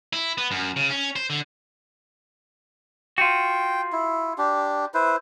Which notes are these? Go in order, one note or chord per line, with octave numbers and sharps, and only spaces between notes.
E4
B3
F#2
C#3
C#4
C5
D3
F4 F#4 G5
E4
D4 G4
E4 B4 C5